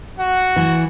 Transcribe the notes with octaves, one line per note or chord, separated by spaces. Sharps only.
F#4 F#5
E3